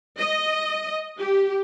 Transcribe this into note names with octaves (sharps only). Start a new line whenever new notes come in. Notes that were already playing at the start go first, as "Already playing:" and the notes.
D#5
G4